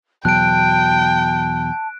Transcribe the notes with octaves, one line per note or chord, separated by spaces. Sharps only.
E2 B2 F#3 G5 A5 F#6 D7